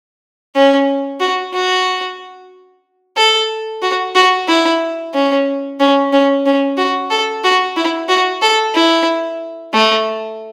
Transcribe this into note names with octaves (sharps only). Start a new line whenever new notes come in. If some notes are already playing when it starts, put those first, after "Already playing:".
C#4
F#4
F#4
A4
F#4
F#4
E4
C#4
C#4
C#4
C#4
F#4
A4
F#4
E4
F#4
A4
E4
A3